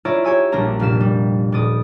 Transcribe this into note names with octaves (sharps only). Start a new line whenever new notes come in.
E4 F4 C#5 D5 E5 A#5
G4 C#5 G#5 E6
A#1 G3 A#3 D4 A#5
F1 A#2 F5 B6 E7
G3
D#1 D5 D#6